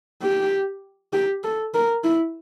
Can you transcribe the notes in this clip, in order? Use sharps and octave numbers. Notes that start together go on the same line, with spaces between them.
G4
G4
A4
A#4
E4